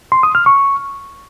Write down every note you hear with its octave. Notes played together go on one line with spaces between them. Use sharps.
C6
D#6
F6
C#6